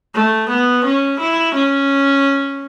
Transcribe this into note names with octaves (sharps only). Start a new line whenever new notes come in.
A3
B3
C#4
E4
C#4